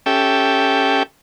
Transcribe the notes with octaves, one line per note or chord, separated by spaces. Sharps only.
C#4 G4 A4 E5 G5